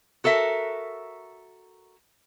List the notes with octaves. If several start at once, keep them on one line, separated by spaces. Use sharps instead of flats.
F#4 A4 A#4 E5